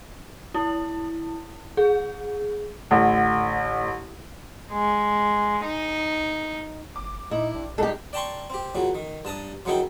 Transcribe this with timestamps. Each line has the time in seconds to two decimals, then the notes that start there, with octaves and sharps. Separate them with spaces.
0.54 E4
1.77 G#4
2.91 A1 D3
4.71 G#3
5.63 D#4
6.96 G1 D6
7.31 A#2 D#4 E4
7.54 A#1 G2
7.78 C2 G#3 D#4 G4 A4
8.13 D5 G5 A5 A#5 C6 C#6
8.50 C4 G4
8.75 A#2 C#3 F#3
8.95 D#3
9.25 G2 A5 A#5 D#6
9.65 F#2 C#3 F#3 D#4 E4 G5